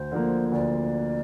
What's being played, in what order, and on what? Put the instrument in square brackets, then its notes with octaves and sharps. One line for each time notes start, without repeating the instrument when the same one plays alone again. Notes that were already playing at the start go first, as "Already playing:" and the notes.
Already playing: [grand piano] D2 [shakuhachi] C5
[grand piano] D3 F3 A#3
[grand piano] D2 [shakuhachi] D5